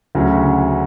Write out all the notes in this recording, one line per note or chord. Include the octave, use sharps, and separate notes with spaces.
D2 C#3 F#3 C#4